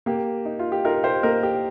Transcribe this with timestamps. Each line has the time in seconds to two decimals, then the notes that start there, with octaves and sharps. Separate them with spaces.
0.06 A#3 G4
0.45 D#4
0.59 F4
0.72 G4
0.85 D#4 F4 A#4
1.04 G4 C5
1.23 A#3 A#4 D#5
1.43 G4